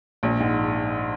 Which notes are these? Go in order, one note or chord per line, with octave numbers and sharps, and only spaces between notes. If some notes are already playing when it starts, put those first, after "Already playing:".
A#1
G#2